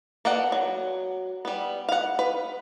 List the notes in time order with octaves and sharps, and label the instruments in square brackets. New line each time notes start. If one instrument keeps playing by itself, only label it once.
[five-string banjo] A#3 B3 A4 D5 F#5
F#3
G3 B3
F5 F#5
B4